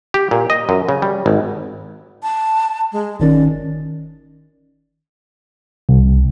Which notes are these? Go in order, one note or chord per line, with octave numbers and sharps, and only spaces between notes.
G4
A#2
D#5
F#2
C#3
G3
G#1
A5
G#3
G1 D#3 C#4 D5
C2